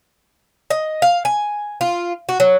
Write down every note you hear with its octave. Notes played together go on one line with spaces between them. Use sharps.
D#5
F5
G#5
F4
F#4
F#3